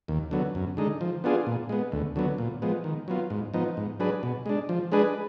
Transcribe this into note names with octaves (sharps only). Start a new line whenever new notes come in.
D#2
D3 F#3 B3
F#2
D3 G#3 D#4
F3
B3 D4 F4 G#4
A#2
G#3 B3
D2
D3 F#3 B3
A#2
F3 G#3 B3
D#3
F#3 B3 F4
G#2
F3 B3 D#4
G#2
F#3 D4 G#4 B4
B2
G#3 D4
F3
G#3 D4 G#4 B4